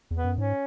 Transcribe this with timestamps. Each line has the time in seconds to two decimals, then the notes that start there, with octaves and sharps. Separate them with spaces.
0.11 E2
0.16 B3
0.24 F#2
0.37 G#2 C#4